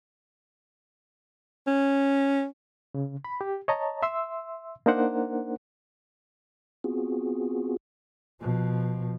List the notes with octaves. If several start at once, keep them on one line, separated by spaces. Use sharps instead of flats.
C#4
C#3
B5
G4
C#5 D#5 A5 A#5
E5 C6 E6
A#3 D4 D#4 A#4 C5 F#5
B3 C4 F4 F#4 G#4
B2 F3